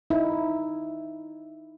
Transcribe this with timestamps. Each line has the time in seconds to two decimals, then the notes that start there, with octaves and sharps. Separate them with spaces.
0.10 D#4 E4